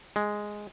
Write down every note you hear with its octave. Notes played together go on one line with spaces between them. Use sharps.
G#3